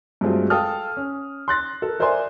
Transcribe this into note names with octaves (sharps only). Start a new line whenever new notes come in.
G2 F#3 G#3 A3 C4 F4
A4 F5 G5 A5 D#6 F6
C#4
C6 F#6 A6 A#6
A4 A#4
A#4 C5 D5 E5 G#5 C6